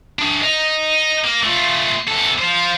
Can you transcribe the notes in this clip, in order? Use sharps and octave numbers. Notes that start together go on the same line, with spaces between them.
D4 G#4
D#5 A#5
A#3
A3 F4
E2 A4
F4 C5